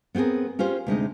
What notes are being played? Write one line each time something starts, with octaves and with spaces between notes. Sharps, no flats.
B3 C4 F#4 G#4 A#4
C#4 F4 G4 C5
D2 C3 G#3 D#4